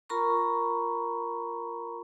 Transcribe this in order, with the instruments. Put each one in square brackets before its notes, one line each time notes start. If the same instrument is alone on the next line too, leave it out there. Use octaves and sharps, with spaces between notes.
[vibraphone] F4 A#4 A#5 B5 C#6